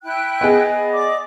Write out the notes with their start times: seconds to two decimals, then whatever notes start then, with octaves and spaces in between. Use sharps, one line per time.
0.03 E4 G5 F#6
0.41 B3 G#4 D#5
0.92 D5 D6